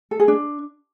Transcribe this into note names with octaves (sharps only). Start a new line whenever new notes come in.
A4
G#4
D4